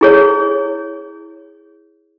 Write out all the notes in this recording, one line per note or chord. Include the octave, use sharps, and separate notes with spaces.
E4 G#4 C#5